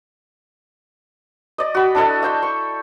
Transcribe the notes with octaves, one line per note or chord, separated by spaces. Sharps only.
D5 D#5
F#4 B5
D4 E4 A4 D#5
E5 G5 C6
C#6